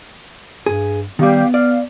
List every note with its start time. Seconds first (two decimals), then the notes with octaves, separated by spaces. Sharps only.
0.66 G2 G#4
1.19 D#3 G3 B3 G4 F5
1.54 D5 F5 F6